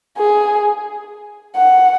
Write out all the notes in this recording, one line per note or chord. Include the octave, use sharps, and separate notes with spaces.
G#4
F#5